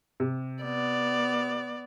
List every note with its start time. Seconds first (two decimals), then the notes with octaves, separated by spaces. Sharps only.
0.20 C3
0.63 B3 D5